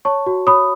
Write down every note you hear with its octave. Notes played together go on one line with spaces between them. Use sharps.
C#5 A5 C#6
F#4
C#5 B5 D#6